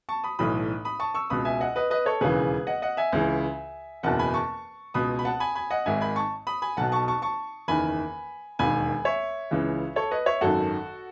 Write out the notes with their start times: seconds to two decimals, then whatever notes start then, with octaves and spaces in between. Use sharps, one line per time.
0.09 A5 C#6
0.24 B5 D#6
0.39 B1 A2 E3 B5 D#6
0.85 B5 D#6
1.00 A5 C#6
1.14 C#6 E6
1.30 C#2 B2 B5 D#6
1.45 E5 G#5
1.61 D#5 F#5
1.76 B4 D#5
1.90 B4 D#5
2.06 A4 C#5
2.21 E1 D#2 C#3 E3 G#4 B4
2.67 D#5 F#5
2.82 D#5 F#5
2.97 E5 G#5
3.13 C#2 C#3 E3
4.03 F#1 E2 B2 F#5 A5
4.19 G#5 B5
4.34 A5 C#6
4.94 C#2 B2 B5 D#6
5.19 B5
5.25 F#5 A5
5.40 G#5 B5
5.55 G#5 B5
5.70 D#5 F#5
5.86 G#1 G#2 D#3 E5 G#5
6.01 G#5 B5
6.16 A5 C#6
6.47 B5 D#6
6.62 G#5 B5
6.77 B1 B2 F#5 A5
6.92 A5 C#6
7.08 A5 C#6
7.22 A5 C#6
7.68 F#1 E2 D#3 G#5 B5
8.59 E1 D#2 D#3 G#5 B5
9.05 C#5 E5
9.51 C#2 C#3 E3
9.96 A4 C#5
10.11 B4 D#5
10.26 C#5 E5
10.41 G#1 F#2 D#3 F#4 A4